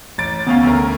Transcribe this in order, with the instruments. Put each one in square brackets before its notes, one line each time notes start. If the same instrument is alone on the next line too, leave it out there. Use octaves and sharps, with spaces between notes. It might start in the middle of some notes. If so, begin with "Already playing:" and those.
[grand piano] A1 A6 D7
[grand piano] D2 C#4 F5 [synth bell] B3
[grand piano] D2 A3 A#4